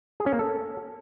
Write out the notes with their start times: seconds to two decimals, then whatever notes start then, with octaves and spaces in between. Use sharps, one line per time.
0.20 G#4
0.26 C#4
0.33 A#3
0.39 A4